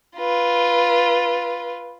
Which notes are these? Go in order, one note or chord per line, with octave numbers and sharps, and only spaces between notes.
F4 B4